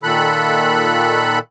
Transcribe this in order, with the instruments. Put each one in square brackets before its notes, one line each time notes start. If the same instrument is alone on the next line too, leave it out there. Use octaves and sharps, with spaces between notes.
[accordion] A#2 D#3 A4 B5 F#6